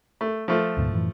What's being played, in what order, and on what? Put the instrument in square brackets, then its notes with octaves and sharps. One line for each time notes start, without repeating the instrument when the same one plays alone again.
[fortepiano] A3
F3 A3
[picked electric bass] D2 G#2 B2
F#2 A2 E3